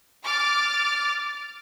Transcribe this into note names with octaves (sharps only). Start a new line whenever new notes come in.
D6 F6 A6